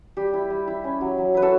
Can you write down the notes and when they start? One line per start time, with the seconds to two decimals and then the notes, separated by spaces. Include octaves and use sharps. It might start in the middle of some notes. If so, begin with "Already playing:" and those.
0.17 G3 G4
0.33 E4
0.50 G3
0.68 E4
0.84 C#4
1.01 F#3
1.18 F#3
1.34 E4 B4
1.42 F#4 A4